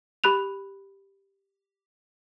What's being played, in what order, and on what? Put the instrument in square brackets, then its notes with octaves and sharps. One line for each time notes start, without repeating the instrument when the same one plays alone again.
[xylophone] G4 B5 F#6 F7